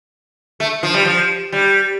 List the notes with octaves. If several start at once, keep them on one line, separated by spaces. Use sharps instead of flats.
A3
F3
G3
F3
G3